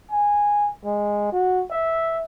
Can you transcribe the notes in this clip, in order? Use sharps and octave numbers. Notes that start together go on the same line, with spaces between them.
G#5
G#3
F#4
E5